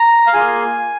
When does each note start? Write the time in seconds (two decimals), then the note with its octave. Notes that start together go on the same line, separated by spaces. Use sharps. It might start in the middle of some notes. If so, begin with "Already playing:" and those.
Already playing: A#5
0.27 F5
0.33 A#3 F4 G#4 G#5